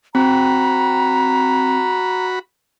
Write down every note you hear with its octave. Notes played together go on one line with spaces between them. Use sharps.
C4 F#4 A#5 B5